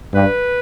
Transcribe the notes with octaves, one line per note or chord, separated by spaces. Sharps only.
G2 B4